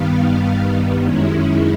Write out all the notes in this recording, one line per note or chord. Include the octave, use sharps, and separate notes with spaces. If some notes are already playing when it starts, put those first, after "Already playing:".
Already playing: G2 D#3 G3 B3 F5
F#2 D#3 G#3 C#4 E4